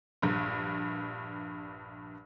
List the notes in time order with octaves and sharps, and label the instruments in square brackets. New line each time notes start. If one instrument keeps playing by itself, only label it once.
[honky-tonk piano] A#1 G2